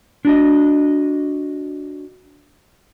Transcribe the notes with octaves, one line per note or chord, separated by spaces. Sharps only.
D4 F#4 D#5